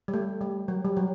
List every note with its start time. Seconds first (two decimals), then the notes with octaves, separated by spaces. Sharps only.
0.08 G3
0.14 A3
0.41 G3
0.68 F#3
0.85 G3
0.97 F#3